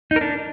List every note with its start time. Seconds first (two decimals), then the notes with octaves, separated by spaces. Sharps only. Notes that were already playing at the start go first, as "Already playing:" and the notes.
0.11 D#4
0.16 A#4
0.21 D4